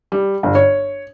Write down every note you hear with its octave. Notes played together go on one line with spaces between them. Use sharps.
G3
G1
C#5